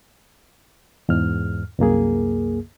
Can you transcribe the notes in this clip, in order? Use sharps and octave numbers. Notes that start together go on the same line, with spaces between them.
E2 G#2 F6
C2 F#2 A#3 G#4